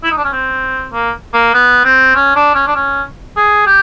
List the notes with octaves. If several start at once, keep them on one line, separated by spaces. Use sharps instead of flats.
E4
D#4
D4
C#4
C4
A#3
A#3
B3
C4
C#4
D4
C#4
D4
C#4
G#4
G4